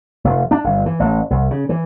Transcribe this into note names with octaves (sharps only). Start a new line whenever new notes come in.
F1
D4
G1
E3
A1
C2
C#3
E3